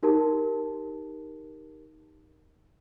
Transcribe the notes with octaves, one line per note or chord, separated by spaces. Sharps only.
D#4 G4 A#4 A5